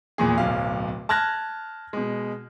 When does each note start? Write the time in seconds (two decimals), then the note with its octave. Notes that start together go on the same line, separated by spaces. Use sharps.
0.18 E2 A#2 G#4
0.38 D1 B1 B2 F5
1.09 A5 F6 F#6 G#6 A#6
1.93 B2 G#3